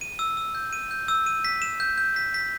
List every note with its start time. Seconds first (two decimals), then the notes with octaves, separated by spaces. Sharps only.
0.01 D#7
0.19 E6
0.37 E6
0.55 G6
0.73 D#7
0.91 G6
1.08 E6
1.26 D#7
1.45 B6
1.62 E7
1.80 G6
1.98 G6
2.16 B6
2.34 B6